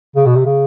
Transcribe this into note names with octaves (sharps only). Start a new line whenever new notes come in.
C#3
B2
C3
C#3